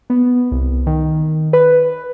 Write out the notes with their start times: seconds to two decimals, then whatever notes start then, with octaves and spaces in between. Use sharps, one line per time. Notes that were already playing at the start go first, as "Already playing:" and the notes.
0.10 B3
0.52 C2
0.87 D#3
1.53 B4